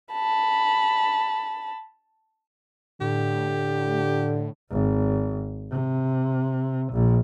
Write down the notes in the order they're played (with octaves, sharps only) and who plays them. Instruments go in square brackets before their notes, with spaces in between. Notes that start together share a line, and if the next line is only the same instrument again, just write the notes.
[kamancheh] A5 B5
[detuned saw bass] A2 [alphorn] D3 [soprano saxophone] G4
[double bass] G#1
C3
A#1